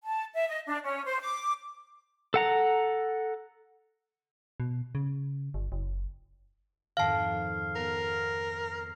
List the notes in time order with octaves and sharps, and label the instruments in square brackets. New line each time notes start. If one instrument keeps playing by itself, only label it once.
[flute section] A5
E5
D#5
D4
C#4
C5
D6
[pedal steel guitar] A4 F#5 A#5
[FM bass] B2
C#3
G1
F#1
[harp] F2 G#2 D#3 [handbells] F5 A5 [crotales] F6 C7
[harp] B3 [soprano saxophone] A#4